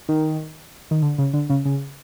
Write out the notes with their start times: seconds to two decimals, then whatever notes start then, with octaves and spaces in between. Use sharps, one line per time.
0.09 D#3
0.91 D#3
1.02 D3
1.18 C#3
1.33 D3
1.50 C#3
1.65 C#3